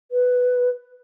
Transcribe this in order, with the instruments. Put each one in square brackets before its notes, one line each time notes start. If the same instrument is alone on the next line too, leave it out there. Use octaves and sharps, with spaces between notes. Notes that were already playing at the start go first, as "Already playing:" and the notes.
[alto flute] B4